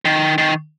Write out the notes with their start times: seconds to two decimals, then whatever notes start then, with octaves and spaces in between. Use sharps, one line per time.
0.05 D#3
0.38 D#3